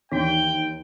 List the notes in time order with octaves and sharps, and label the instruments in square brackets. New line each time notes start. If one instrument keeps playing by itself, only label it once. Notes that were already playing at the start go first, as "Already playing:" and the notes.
[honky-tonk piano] D#2 [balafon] D#3 E3 D4 [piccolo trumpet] G5